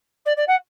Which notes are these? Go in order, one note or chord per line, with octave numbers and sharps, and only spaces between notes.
D5
D5
F#5